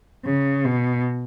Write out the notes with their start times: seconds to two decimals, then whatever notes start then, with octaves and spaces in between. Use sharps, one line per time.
0.25 C#3
0.64 B2